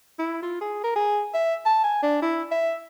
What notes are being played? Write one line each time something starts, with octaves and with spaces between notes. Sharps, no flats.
E4
F4
G#4
A#4
G#4
E5
A5
G#5
D4
E4
E5